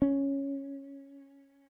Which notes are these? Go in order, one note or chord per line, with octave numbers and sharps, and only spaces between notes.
C#4